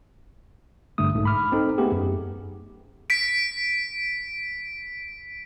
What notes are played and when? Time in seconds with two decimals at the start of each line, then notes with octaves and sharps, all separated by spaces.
0.98 A1 G2 D3 A3 D#6
1.14 B1 G#2 A3
1.25 B5 D6 F6
1.52 C4 D#4 A4
1.78 A3 B3 D#4 G4 G#4
1.92 F#2
3.10 B6 D7